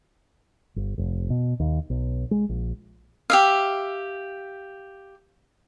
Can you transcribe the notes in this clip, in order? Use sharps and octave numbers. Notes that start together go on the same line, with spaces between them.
G1
F1
B2
D#2
B1
G#3
A#1
G4 E5 F5